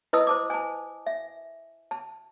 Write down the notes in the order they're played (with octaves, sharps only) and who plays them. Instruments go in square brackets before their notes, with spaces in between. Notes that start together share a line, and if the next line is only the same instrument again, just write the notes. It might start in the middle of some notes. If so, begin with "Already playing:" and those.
[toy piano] E4 B4 D#5 A5 D#6 E6
C5 A5 D6
G#5 A5
E5
A5